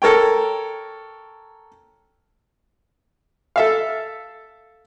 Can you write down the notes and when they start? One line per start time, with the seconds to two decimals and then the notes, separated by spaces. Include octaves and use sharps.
0.02 A4 A#4 C#5 G5
3.56 A4 E5 F5